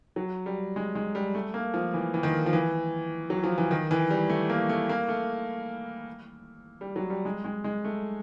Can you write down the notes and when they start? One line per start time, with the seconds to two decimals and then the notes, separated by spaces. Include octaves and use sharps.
0.16 F#3
0.46 G3
0.76 G#3
0.95 G#3
1.15 G3
1.35 A3
1.54 A#3
1.74 F3
1.94 E3
2.14 E3
2.23 D#3
2.46 F3
2.53 E3
3.30 F#3
3.44 F3
3.58 E3
3.71 D#3
3.91 E3
4.10 G3
4.29 A3
4.50 A#3
4.69 A3
4.89 A#3
5.08 A3
6.81 G3
6.96 F#3
7.10 G3
7.25 G#3
7.45 G#3
7.64 G#3
7.84 A3